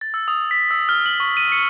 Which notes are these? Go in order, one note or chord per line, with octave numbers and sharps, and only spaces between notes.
A6
E6
D#6
B6
E6
F6
F#7
C#6
D#7
C#7